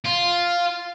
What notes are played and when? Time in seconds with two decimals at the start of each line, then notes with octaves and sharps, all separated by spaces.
0.05 F4